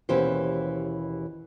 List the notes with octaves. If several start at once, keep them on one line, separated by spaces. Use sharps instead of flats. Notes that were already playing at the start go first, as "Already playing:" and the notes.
D#2 B2 E3 C#4 G4 C5